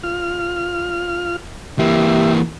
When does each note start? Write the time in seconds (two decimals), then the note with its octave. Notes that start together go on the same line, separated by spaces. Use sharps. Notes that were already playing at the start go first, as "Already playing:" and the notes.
0.03 F4 F6
1.79 E3 A#3 G4 E5